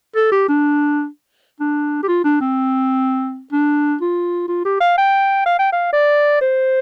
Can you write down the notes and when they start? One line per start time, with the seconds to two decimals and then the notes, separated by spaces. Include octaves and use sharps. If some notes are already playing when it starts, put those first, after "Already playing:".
0.15 A4
0.31 G4
0.49 D4
1.60 D4
2.03 G4
2.08 F4
2.24 D4
2.41 C4
3.52 D4
4.01 F4
4.48 F4
4.65 G4
4.80 F5
4.98 G5
5.46 F5
5.59 G5
5.73 F5
5.93 D5
6.41 C5